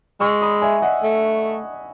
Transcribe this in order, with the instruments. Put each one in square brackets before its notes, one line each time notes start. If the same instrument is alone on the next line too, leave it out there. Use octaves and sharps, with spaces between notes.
[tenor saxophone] G#3 [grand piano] C#6 E6
[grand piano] B5 D#6
E5 G#5
D#5 F#5
[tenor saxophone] A3